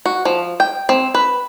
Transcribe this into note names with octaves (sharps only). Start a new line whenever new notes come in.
F#4
F3
G5
C4
B4